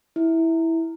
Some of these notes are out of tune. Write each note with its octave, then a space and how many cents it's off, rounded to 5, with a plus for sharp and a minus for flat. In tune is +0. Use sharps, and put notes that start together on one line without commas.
E4 -10